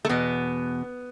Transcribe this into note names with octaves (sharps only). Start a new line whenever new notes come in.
A3
E2 B2 B3